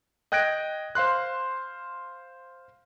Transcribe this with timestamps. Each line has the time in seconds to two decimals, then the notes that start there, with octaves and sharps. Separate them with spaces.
0.32 D#5 G5 F#6 G#6 A#6 D7
0.95 C5 F5 C6 F#6